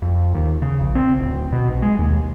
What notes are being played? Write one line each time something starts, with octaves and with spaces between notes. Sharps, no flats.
F2
D#2
C#3
A#1
C4
D1
B2
B1
G#3
D#2